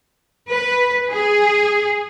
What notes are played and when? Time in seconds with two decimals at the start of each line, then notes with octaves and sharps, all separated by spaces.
0.49 B4
1.11 G#4